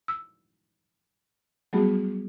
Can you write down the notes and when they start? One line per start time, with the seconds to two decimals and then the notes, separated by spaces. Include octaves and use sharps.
0.08 E6
1.73 F#3 G3 A3 B3 F#4 G#4